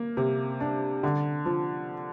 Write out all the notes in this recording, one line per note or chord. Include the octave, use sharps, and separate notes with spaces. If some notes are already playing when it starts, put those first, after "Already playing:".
Already playing: A#3
C3
D4
D3
F3